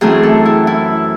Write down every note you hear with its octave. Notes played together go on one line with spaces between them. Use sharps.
F#2 E3 A3 C4 G#4
A4
E4
E4